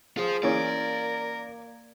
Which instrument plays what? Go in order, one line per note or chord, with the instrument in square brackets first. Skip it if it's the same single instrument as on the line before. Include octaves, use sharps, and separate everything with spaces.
[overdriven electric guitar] F4 C5 [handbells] G#4 D#6
[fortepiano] E3 C#4 [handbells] A#3 G#6 [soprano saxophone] A#4 [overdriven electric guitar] D5